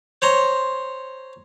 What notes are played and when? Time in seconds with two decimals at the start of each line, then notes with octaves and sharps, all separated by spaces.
0.22 C5 C#5 A#5 C6